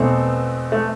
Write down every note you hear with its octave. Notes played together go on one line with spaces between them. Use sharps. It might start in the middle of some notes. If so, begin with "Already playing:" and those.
Already playing: E2 B2 A3 C4
A3